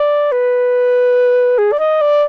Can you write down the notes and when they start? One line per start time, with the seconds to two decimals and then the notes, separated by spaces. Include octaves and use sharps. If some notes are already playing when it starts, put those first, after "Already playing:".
Already playing: D5
0.32 B4
1.58 G#4
1.72 D5
1.79 D#5
2.01 D5